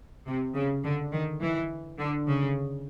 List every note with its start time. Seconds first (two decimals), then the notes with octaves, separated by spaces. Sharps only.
0.27 C3
0.55 C#3
0.84 D3
1.13 D#3
1.41 E3
1.98 D3
2.27 C#3